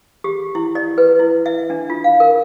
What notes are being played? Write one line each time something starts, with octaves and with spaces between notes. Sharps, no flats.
G4
E4
D5
B4
E4
E5
D4
F4
F5
A#4